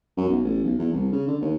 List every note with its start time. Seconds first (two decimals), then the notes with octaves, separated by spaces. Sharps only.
0.17 F#2
0.29 B1
0.45 A1
0.64 B1
0.79 E2
0.93 C2
1.12 C#3
1.28 D3
1.42 D#2